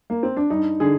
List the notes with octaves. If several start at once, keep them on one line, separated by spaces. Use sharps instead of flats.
A#3
C4
D4
G2 D#4
D3 G#4